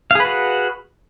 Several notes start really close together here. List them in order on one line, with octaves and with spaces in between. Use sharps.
F5 G#4 B4 F#4